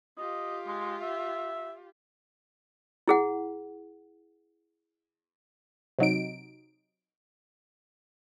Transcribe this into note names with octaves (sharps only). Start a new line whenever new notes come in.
F4 G4 D#5
G#3
E5
E4 G#4 F#5
C3 F#3 D#4 D7